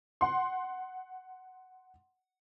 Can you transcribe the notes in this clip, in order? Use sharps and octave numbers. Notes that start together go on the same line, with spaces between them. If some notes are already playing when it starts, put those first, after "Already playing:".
F#5 C6